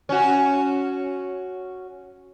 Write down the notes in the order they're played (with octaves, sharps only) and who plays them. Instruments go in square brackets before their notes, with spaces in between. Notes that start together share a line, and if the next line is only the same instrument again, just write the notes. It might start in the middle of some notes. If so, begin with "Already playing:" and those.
[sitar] C#4 F#4